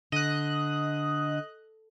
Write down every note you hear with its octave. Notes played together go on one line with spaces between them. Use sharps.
D3 D#5 F#6